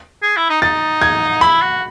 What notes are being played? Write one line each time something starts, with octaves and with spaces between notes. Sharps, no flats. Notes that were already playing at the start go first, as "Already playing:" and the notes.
G#4
E4
D#4
D#4 A6
G#6
E4 B5
F#4